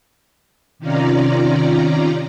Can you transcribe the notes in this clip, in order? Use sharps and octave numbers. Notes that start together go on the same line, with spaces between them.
C3 D#3 C#4 F4 D5 A#5